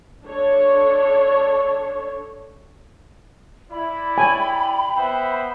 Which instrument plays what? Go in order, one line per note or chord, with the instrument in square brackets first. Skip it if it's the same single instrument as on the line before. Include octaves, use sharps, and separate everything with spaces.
[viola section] D4 A4 C#5
[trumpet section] E4 D5 [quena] B5
[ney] G5 [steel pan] G#5
[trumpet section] B3 C5 E5